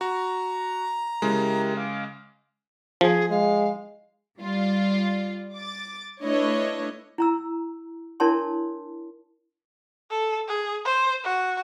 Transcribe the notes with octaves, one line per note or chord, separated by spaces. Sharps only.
F#4 A#5
C#3 G#3 E4 G4 A#4
F5 D6
F3 G#4
G#3 F5
G3 F4 D5
D6 A6
A3 D4 E4 B4 C#5 D#5
E4 A#5 E6
D4 E4 A#4 C#5 A5 C6
A4
G#4
C5
F#4